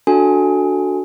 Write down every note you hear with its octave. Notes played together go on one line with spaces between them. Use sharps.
D4 F#4 A4 G#5